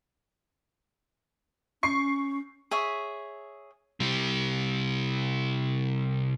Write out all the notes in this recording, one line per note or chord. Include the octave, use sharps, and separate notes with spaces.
C#4 C#6 C7
G#4 C#5 E5
C3 G3